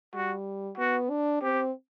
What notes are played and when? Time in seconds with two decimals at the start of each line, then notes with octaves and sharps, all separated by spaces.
0.14 G3 F#4
0.78 B3 F#4
1.10 D4
1.42 C4 G4